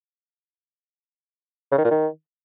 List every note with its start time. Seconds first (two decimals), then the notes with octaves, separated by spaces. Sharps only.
1.72 C#3
1.78 D#3
1.85 A#2
1.91 D#3